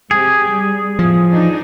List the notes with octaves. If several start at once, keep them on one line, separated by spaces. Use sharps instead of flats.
C3 G4 G#4
G3
E2 A2 F3
E3 D4 D#4